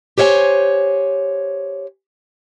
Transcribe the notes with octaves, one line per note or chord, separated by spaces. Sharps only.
G4 C5 C#5 E5 G#5